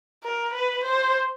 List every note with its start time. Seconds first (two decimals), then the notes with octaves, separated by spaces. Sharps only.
0.23 A#4
0.54 B4
0.84 C5